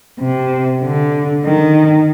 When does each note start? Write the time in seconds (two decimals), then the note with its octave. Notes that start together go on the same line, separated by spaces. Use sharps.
0.20 C3
0.82 D3
1.45 D#3